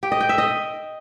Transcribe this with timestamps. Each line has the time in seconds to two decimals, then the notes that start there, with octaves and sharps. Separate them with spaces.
0.03 G4
0.12 D#5
0.20 G5
0.29 E5
0.38 D#5